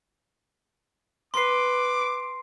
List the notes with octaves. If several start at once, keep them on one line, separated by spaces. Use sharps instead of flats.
B4 C6 D6 C7